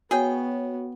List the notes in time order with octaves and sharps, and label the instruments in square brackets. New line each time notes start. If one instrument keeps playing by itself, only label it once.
[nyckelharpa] B3 [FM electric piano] F#4 C#5 [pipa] G#4 G5